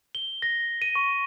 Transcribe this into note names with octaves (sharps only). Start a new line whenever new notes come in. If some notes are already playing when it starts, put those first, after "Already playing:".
G7
A#6
D#7
C#6